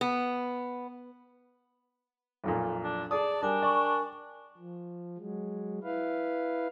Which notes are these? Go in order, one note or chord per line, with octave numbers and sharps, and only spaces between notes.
B3
B1 F2 A#2
D4
G#4 D5 A5 D#6
G3 D4 A#4 G5 G#5
D5 C#6
F3
F#3 G#3
E4 B4 F5